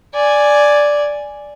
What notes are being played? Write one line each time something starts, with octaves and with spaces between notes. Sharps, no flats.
D5 G#5